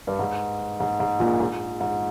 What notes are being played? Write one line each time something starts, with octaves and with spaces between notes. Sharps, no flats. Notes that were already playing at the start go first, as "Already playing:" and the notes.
G2
G#2
G#2
G#2
A#1 A#2
G#2
G#2